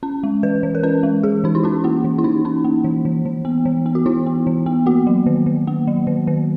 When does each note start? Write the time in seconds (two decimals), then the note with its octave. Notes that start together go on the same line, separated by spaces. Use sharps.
0.03 C#4
0.23 G#3
0.43 E3 B4
0.63 E3
0.75 A#4
0.83 C#4 B4
1.03 G#3
1.23 E3 G#4
1.44 E3 D#4
1.55 E4
1.63 C#4 F#4
1.84 A#3 E4
2.04 E3
2.18 E4
2.24 E3 D#4
2.45 C#4 D#4
2.64 A#3
2.84 E3
3.05 E3
3.25 E3
3.45 B3
3.65 E3
3.86 B3
3.95 F#4
4.06 E3 E4
4.26 B3
4.47 E3
4.66 B3
4.86 A#3 F#4
5.07 F#3
5.26 D#3
5.46 D#3
5.67 A#3
5.87 F#3
6.07 D#3
6.27 D#3